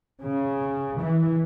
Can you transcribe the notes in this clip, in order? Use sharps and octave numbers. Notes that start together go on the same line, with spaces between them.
C#3
E3